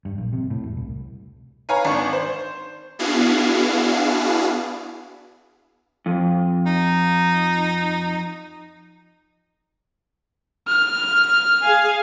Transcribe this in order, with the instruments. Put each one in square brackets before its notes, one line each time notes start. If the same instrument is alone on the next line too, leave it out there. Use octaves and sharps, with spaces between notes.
[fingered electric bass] G2
A#1
C3
A2
E1
C2
[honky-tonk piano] B4 C#5 F5 G#5 A#5
G#1 D4 C#6
C5
[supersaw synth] B3 D4 E4 F#4 G#4 F5
[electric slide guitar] F2
[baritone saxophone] D#4
[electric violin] F6
[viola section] G#4 F5 G#5